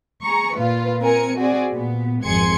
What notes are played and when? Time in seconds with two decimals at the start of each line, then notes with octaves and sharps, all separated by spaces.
0.22 G#4 A#5 C#6
0.55 A#2 F4 B4
1.02 C4 A#4 G#5 C#7
1.37 C4 F#4 G#4 D5
1.71 A#2 B3
2.24 G#1 F2 G#4 C6 G#6 C#7